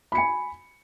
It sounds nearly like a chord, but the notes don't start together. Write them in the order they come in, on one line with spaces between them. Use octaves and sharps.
B5 C#7 G#5